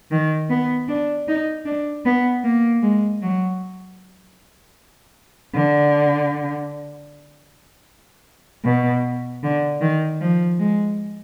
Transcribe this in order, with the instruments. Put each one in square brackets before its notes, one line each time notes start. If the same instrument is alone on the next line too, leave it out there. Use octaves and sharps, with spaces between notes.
[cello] D#3
B3
D4
D#4
D4
B3
A#3
G#3
F#3
D3
B2
D3
D#3
F3
G#3